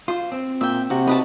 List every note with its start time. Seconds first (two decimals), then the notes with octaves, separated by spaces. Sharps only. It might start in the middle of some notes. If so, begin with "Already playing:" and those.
0.08 F4 C5
0.32 C4
0.61 A#2 E5 G5
0.90 C3 F#4
1.07 D#4 F#4 B4 F#5 A5